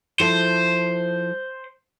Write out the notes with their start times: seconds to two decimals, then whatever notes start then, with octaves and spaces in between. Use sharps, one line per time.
0.20 F3 E4 A4 C5